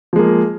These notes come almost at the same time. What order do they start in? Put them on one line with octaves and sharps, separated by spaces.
F3 G#3 A#3